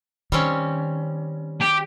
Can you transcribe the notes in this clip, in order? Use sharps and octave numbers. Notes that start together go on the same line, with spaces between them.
D#3 G3 C4 C#4
G4